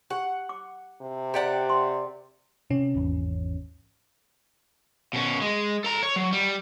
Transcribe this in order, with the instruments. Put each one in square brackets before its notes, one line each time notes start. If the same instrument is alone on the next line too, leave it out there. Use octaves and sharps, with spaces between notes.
[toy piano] G4 [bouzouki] F#5
[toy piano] D6
[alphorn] C3
[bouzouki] G4 D5 F#5 [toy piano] G5 A#5
[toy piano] C6
[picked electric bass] C3 [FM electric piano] C#4
[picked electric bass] G#1 E2
[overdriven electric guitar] B2 C#4
G#3
A4 A#5
C#5
F#3
G3